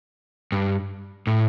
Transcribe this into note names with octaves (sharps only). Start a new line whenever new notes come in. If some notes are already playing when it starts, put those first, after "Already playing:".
G2
A2